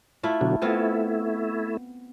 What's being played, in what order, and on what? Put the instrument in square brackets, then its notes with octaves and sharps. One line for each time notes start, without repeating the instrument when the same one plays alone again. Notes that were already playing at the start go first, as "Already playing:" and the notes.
[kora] A3 E4 F4
[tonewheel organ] B2 D3 F#3
[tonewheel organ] A3 E4 [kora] B3 C4 F4